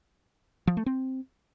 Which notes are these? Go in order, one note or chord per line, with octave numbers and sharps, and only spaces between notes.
F3
A3
C4